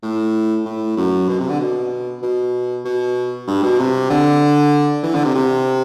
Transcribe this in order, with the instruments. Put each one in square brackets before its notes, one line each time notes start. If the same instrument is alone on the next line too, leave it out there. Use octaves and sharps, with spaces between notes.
[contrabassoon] A2
A2
F#2
B2
C3
D3
B2
B2
B2
G2
B2
C3
D3
E3
D3
C3
C3